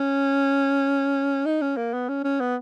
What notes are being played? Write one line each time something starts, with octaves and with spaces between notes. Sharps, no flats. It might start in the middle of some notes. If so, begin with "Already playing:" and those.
Already playing: C#4
D#4
C#4
A#3
B3
C#4
C#4
B3